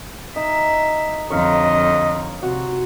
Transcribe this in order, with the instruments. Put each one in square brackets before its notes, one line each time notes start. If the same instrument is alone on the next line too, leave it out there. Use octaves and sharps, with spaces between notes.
[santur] D#4 [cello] E5
[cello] F2 D3 [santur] C#5 F5 A#5 [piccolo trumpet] D#5
[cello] C3 [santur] F#4